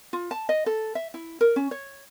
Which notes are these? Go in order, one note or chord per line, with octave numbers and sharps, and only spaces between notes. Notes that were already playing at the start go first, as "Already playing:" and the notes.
F4
A5
D#5
A4
E5
E4
A#4
C#4
C#5